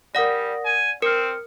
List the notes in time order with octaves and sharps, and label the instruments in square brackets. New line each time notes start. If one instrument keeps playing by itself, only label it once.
[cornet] G3 [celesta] A#4 D#6 A#6 [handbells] D5 F#5
[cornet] G#5
[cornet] C4 [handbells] A#4 [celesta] F6 C#7